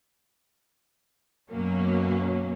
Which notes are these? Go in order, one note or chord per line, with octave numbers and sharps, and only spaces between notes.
F#2 B2 F#3 A#3 C#4